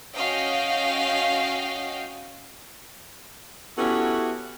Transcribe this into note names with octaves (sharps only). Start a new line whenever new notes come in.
C#4 F#4 D#5 F5 G5
B3 C#4 E4 F#4 G4 A4